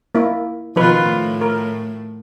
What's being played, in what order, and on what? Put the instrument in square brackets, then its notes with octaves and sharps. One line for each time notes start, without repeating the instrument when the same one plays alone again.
[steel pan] A#3 E4
[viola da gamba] B2 D#3 F4 [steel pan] F3 D#4 B4
[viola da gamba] A2
[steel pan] A#4